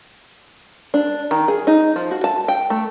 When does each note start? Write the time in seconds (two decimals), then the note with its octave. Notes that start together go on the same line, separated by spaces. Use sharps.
0.94 D4
1.31 D#3
1.48 G#4
1.67 D#4
1.96 F3
2.11 F#4
2.24 A5
2.48 G5
2.70 A3